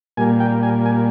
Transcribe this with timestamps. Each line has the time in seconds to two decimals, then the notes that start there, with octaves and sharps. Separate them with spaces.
0.17 A#2 G3 A#3 G#5
0.40 G5
0.63 G#5
0.86 G#5